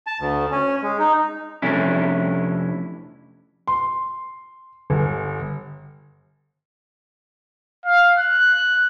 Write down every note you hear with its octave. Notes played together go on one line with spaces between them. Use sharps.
A5
D2
C#4
G#3
D#4
F2 C3 A3 C#4 D4 E4
C6
G1
F5
F#6